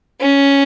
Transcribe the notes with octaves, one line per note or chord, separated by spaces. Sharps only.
C#4